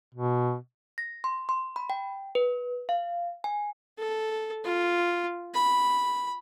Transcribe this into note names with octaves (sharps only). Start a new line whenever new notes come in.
B2
A#6
C6
C6
B5
G5
B4
F5
G#5
A4
F4
B5